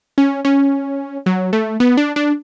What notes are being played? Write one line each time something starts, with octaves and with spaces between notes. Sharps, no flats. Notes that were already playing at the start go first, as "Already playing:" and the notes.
C#4
C#4
F#3
A3
B3
D4
D4